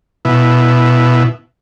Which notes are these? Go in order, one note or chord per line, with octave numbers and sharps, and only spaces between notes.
B2 E4